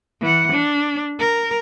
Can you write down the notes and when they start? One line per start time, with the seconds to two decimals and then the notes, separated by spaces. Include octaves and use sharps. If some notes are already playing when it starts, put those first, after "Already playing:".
0.22 E3 F#5
0.52 D4
1.19 A#4